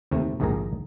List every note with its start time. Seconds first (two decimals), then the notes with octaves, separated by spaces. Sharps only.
0.11 D#2 C3 A3
0.40 A#1 D#2 G#2 D#3 G#4 A#5